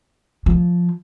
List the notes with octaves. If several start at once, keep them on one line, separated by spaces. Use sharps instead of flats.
F3